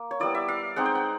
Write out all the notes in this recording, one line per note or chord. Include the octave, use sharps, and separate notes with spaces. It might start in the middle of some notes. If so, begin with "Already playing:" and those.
Already playing: A#3
C#5
G3 B3 E4 D5
E5
F5
G#3 C4 D#4 F#5
G5
F#5